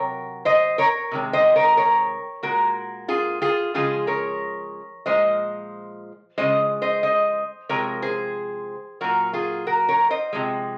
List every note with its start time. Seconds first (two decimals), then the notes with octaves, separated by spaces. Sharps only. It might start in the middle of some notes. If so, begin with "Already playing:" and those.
Already playing: C3 F#3 A#4 C#5
0.45 C5 D#5
0.78 A#4 C#5
1.11 C3 D#3 G#3
1.33 C5 D#5
1.56 A#4 C#5
1.77 A#4 C#5
2.43 A#2 G#3 F#4 A#4
3.08 F4 G#4
3.42 F4 G#4
3.74 C#3 F3 G#3 F4 G#4
4.07 A#4 C#5
5.06 A#2 F3 G#3 C5 D#5
6.38 C#3 F3 G#3 C5 D#5
6.82 C5 D#5
7.03 C5 D#5
7.69 C3 F3 G#3 A#4 C#5
8.02 G#4 C5
9.01 A#2 F#3 F#4 A#4
9.33 F4 G#4
9.67 F#4 A#4
9.89 A#4 C#5
10.10 C5 D#5
10.33 C3 F3 G#3